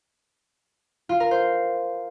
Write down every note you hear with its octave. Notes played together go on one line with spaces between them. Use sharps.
F4
A#4
C5